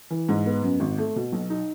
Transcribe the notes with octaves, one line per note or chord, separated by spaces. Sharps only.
E3
G#2
B3
F#2
G#1
A3
B2
B1
D#4